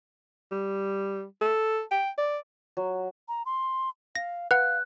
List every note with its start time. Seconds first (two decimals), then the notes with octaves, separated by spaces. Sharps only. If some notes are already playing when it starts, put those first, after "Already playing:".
0.52 G3
1.41 A4
1.91 G5
2.18 D5
2.77 F#3
3.28 A#5
3.46 C6
4.15 F5 A#6
4.51 B4 F5 F#5 F#6